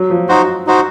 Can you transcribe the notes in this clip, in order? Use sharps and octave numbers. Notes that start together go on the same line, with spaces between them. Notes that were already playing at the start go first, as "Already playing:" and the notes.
Already playing: F#3
F3
D#4 F#4 C5
D#4 F#4 C5